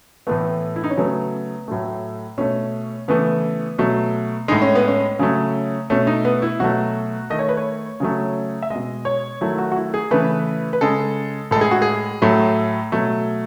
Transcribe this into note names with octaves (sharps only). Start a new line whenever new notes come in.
A2 E3 A3 B3
E4
D#4
C#4
C#3 F#3 A3 B3
A2 F#3 A3
B2 A3 C#4
C#3 E3 A3 B3
B2 F#3 A3
A2 G#3 D#4
C#4
B3
C#4
C#3 F#3 A3
B2 A3 C#4
D#4
B3
E4
B2 F#3 A3 F#4
D#3 A3 D#5
C#5
B4
C#5
C#3 F#3 A3
E5
B2 G#3 D#5
C#5
D#3 F#3 A3 E4
F#4
F#4
E4
G#4
C#3 E3 A3 B4
B4
C#3 G#3 A4
A2 G#3 A4
G#4
F#4
G#4
A2 F#3 A3
B2 F#3 A3